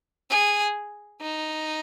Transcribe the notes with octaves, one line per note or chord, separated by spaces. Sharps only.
G#4
D#4